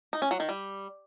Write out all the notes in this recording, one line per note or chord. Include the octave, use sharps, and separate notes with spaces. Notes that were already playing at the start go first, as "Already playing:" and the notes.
D#4
C#4
F#3
D#3
G3